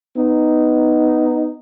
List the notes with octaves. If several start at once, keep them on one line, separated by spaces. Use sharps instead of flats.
B3 D#4